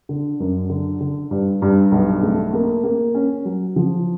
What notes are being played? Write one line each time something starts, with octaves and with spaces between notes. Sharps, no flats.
D3
F#2
D3
D3
G2
G2
B1
A3
A#3
A#3
C#4
F#3
F3